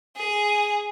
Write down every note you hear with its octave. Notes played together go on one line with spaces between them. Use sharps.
G#4